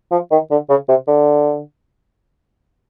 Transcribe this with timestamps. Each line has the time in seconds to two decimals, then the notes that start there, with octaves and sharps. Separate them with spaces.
0.12 F3
0.32 D#3
0.51 D3
0.70 C#3
0.89 C3
1.08 D3